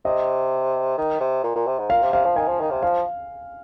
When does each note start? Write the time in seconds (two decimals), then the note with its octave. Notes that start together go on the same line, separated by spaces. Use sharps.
0.05 C3 D#5
0.98 D#3
1.20 C3
1.43 A#2
1.55 A#2
1.66 C3
1.79 G#2
1.90 A#2 F5
2.02 C3
2.13 C3 F5
2.25 F3
2.36 D#3 G#5
2.48 F3
2.60 D#3
2.70 C3
2.83 F3 F5